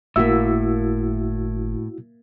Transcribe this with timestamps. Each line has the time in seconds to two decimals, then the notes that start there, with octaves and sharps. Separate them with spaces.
0.16 G1 A2 A#3 E4 F#4 E5 E6